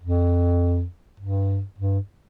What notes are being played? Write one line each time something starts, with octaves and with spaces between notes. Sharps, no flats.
F2
G2
G2